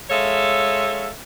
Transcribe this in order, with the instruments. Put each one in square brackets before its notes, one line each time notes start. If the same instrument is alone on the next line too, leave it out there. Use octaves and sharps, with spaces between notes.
[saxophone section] G#3 A4 C#5 E5 F5